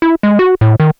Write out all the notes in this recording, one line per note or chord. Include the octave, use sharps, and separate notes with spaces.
E4
G#3
F#4
A2
D#3